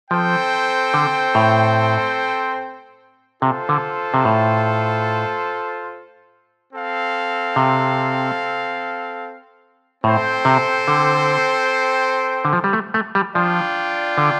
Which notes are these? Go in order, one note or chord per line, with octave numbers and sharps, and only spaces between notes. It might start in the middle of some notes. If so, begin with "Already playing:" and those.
F3 C4 A4 C5 G5
D3
A2
C3 F4 A4 C5
D3
C3
A2
C4 A4 F5
C3
A2 C4 A4 C5 G5
C3
D3
D3
F3
G3
A3
A3
G3
F3 D4 F4 D5 G5
D3